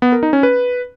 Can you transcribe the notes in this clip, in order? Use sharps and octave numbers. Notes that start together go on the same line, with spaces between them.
B3
A#4
D#4
C#4
B4